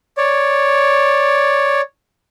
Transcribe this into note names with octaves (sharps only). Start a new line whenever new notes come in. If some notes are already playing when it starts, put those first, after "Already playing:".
C#5 D5